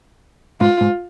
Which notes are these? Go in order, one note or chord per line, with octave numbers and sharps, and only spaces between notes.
G#2 F4
G#2